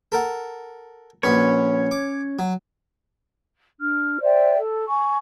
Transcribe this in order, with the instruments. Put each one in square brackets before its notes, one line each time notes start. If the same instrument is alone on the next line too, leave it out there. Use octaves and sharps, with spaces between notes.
[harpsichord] A4 A#4 F#5
[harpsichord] A#1 F#4 B4 [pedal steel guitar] C#4 C#5
[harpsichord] D6
F#3
[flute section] D4 F6
C5 D5 E5 G5
A4
G#5 C#6